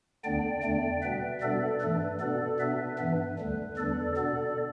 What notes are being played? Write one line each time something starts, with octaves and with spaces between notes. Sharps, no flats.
D2 D3 B3 D4 D5 G5
E2 D3 A3 D4 D5 G5
B2 G3 B3 B4 E5
B2 G3 B3 D4 A4 D5
G2 E3 A3 D4 B4
B2 B3 D4 A4 D5
B2 B3 D4 B4 E5
G2 E3 B3 D4 B4
D2 D3 G3
E2 D3 G3 D4 A4 D5
B2 B3 D4 A4 D5